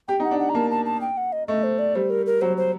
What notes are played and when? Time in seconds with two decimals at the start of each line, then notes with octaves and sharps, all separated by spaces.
0.08 G4 G5
0.20 D#4
0.24 F#5
0.31 D4
0.39 F#5
0.49 A#5
0.55 A#3 A5
0.70 A5
0.85 A5
1.01 G5
1.17 F#5
1.33 D#5
1.48 A3 D#5
1.64 C5
1.79 D5
1.95 G3 C5
2.10 A#4
2.26 A#4
2.41 F#3 C5
2.57 C5